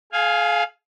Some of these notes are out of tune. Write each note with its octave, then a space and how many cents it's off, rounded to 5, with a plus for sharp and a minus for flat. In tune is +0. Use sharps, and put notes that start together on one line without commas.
G#4 +40 F5 +0 G#5 -15